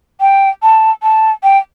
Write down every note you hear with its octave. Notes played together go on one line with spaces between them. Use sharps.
G5
A5
A5
G5